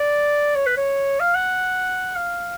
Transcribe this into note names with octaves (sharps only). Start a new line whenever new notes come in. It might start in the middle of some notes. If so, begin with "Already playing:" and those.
Already playing: D5
C#5
B4
C#5
F5
F#5
F5